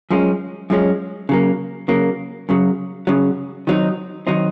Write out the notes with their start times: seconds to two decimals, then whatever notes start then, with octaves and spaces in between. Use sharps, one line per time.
0.10 F#2 F3 G#3 C#4
0.70 F#2 F3 G#3 C#4
1.29 C#3 F#3 A#3
1.88 C#3 F#3 A#3
2.49 F#2 C#3 F#3
3.07 F#2 C#3 F#3
3.67 D#3 F#3 C4 D#4
4.27 D#3 F#3 C4 D#4